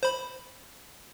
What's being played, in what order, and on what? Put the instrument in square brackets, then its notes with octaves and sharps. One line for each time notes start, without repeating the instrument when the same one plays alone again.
[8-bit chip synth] C5 B5